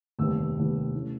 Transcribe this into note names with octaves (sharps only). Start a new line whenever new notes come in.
F1 D#2 D#3 G3 B3 E6
F1 D#2 D#3 G3 B3
E3 A3 C#4